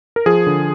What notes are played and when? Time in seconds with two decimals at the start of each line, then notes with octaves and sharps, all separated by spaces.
0.16 A#4
0.26 F3 G#4
0.47 D3